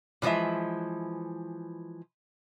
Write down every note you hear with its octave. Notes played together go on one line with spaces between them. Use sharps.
A#2 E3 F3 G#3 E5